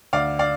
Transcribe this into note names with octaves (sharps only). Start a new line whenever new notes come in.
D2 D5 F5
D5 F5